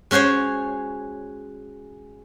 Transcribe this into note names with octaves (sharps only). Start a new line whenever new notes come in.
G#3 C#4 F#4 C5 C#5